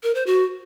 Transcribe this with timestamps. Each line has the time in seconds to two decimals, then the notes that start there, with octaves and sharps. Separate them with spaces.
0.03 A#4
0.15 C5
0.27 F#4